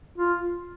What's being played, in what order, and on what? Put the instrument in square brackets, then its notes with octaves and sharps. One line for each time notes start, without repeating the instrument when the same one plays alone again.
[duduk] F4